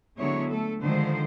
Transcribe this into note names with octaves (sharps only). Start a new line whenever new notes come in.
D3 F#3 G#3 B3 E4 C#5
A3 A4
D3 D#3 F3 G#3 C5